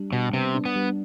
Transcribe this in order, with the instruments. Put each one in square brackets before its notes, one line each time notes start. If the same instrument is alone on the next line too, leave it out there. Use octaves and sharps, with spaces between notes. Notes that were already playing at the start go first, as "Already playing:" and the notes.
Already playing: [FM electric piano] G3 D4
[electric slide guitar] B2 [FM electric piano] G3
[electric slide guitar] C3 [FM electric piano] B3
[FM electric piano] D4
[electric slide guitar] B3
[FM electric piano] G3